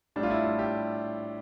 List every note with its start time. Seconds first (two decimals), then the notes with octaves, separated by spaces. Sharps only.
0.16 A2 G3 D4
0.23 F4
0.30 E4
0.44 F4
0.59 G4